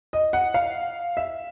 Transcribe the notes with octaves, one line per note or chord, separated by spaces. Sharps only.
D#5
F#5
F5
E5